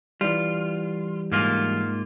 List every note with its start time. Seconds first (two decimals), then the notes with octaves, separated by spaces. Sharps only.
0.21 E3 G3 F4
1.32 G#2 A#3 F4